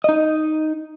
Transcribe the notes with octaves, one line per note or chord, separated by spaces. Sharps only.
D#4 D#5